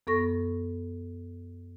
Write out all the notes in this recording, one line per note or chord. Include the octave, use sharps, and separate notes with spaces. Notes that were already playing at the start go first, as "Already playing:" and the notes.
F#2 B3 A4 C#6 A#6